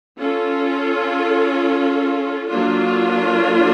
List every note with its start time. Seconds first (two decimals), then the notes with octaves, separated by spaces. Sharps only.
0.18 C#4 F4 A4
2.48 F#3 A#3 D4 F4 A4